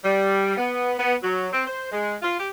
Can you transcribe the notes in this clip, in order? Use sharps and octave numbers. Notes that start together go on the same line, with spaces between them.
G3
B3
B3
F#3
C4
C5
G#3
F4
G4